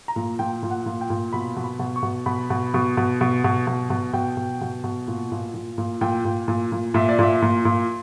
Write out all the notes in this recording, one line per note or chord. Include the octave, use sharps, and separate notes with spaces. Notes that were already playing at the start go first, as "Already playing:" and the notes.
A#5
A#2
A#2 G5
A#2
F#5
A#2
G5
A#2
B2 B5
B2
B5
B2
C#6
B2
B2 B5
B2
B2
B2
B2
B2
B2
B2
B2 G5
B2
B2
B2
A#2
A#2
A#2
A#2
A#2 G5
A#2
A#2
A#2
A#2 E5
D5
A#2 E5
A#2
A#2